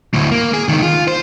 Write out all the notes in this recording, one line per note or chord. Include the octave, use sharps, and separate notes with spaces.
D2 A2
A#3
G#4
C#2 D#3
F4
C5